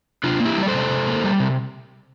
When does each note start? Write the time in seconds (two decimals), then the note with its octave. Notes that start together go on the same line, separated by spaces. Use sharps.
0.24 C3 D4 F4
0.40 A#3
0.45 E4 G4
0.57 G3
0.63 D5
0.68 A4 C5
0.74 C3
0.90 C3
1.07 A#3
1.24 G3
1.40 C3